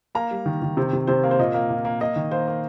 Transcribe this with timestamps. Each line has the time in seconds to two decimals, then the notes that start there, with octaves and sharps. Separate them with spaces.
0.15 A#3 A#5
0.31 G3
0.46 D#3
0.62 D#3
0.77 C3 C5
0.93 C3
1.07 C3 C5
1.23 A#3
1.31 C5
1.39 A#2 D#5
1.54 A#3
1.70 A#2
1.85 A#3
2.00 A#3 D#5
2.16 D#3
2.31 A#3 C5
2.47 A#3